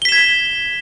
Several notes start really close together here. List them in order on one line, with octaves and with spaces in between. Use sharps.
G7 B6 E7 G#6